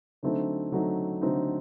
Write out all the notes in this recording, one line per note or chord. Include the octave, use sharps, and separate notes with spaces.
D3 F#3 A3 C4 D#4
D3 F#3 A3 C4 D#4
D3 F#3 A3 C4 D#4